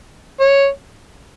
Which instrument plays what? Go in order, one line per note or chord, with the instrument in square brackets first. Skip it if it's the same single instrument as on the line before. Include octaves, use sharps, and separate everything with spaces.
[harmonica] C#5